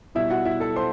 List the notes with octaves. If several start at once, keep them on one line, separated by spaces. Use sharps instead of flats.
B2 G3 E4 E5
F#4 F#5
E4 E5
A4 A5
C5 C6